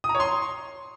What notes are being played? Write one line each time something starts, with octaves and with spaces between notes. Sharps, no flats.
D#6
A#5
C#5
C6